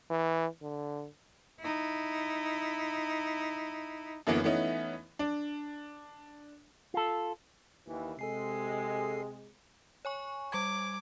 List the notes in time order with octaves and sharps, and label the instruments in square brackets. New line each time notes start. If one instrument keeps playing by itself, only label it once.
[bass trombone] E3
D3
[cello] D#4 E4
[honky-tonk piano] F#2 D3 E3 F#3 A#3 B3
E3 A3 B3 C#4 D#4
D4
[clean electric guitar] F4 A4
[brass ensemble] D#2 E3
[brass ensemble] C3 G#3 [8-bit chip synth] A4 G#5 C7
[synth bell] C#5 G#5 C#6
[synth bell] G3 G#6 [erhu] D6